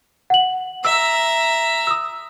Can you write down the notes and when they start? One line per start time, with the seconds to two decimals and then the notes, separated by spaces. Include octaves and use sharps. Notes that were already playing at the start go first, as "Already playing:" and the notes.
0.30 F#5 F#7
0.85 E5 A#5 E6
1.87 D#6 E6